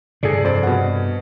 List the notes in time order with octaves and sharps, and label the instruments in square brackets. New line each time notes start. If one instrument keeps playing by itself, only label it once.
[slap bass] G2 C3 [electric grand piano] G#4 A4 D5
[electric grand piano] F2 C5 D5
B2 F#5